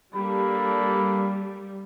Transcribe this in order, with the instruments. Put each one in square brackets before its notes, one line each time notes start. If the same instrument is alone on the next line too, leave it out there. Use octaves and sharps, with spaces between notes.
[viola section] G3 [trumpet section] A#3 D4 A4 [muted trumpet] B5